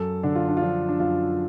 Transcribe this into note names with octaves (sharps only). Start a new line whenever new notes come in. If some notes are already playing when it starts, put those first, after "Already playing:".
Already playing: F#2 A4
D3 D4
F4
D4
F4
F3 D4
D4
F#2 F4